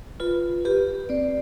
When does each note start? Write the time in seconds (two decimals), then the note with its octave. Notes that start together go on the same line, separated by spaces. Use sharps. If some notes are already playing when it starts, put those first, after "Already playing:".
0.20 F4 B4
0.65 G4 B4
1.09 C4 D5